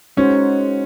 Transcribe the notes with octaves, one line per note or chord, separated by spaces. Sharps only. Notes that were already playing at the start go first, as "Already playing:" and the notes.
G#3 C#4 D#4 F#4 C5